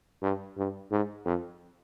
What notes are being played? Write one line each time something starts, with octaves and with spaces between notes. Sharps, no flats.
G2
G2
G#2
F2